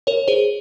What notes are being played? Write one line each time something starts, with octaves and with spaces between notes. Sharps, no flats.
A#4 C#5
G#4 C5